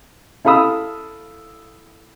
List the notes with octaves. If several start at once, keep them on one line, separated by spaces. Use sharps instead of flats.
E4 A4 F5 B5 D#6 E6